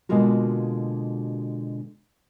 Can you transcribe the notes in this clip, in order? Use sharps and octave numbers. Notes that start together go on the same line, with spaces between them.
B2 D3 G#3 A#3 F4 F#4